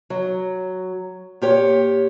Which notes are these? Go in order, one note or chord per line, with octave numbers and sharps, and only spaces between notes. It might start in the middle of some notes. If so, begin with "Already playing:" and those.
F#3
A#2 G4 C#5